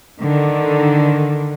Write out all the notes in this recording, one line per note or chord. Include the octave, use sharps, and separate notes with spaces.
D3 D#3